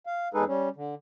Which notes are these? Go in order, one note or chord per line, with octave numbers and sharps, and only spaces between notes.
F5
E2 G#3 D#4 G#4 A4 B4
G3 C#4
D3